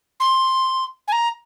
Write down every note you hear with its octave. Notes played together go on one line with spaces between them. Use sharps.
C6
G#5
A#5